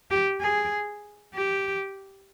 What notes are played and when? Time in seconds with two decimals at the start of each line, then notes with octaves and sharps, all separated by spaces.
0.11 G4
0.41 G#4
1.35 G4